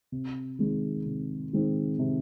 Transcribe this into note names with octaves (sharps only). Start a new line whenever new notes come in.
C3
D#3 G#3 C4 D#4
C3
D#3 G#3 C4 D#4
C3